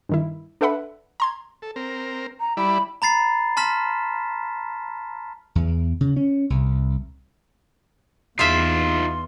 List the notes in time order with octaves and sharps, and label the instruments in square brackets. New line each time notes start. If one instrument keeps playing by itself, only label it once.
[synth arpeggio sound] G2 D#3 E4
D4 A4 B4 E5 F#5 B5
A#5 C6 G#6
[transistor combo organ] A4
C4 A#4
[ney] A#5
[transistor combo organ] G3 E4 D5 [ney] B5
[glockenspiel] A#5 B5 A6 C7
A5 C6 F6 B6 E7
[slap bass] E2
C#3
C#4
C2
[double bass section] E2 [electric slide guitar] D#4 F4 [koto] E5 F5 [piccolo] C6